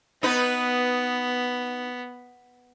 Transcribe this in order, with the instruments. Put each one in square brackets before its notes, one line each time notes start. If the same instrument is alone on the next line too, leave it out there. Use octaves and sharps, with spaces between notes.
[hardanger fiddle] B3 [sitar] D#4 B4